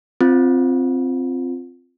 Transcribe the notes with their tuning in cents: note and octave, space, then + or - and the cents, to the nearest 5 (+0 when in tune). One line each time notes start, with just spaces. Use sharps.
C4 +0 F4 +0